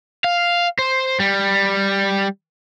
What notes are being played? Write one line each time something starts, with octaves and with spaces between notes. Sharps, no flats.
F5
C5
G3